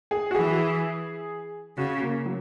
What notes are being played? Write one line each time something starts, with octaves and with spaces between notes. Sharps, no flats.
G#4
F#4
E3 G#4
C#3 F#4
A#3
F#3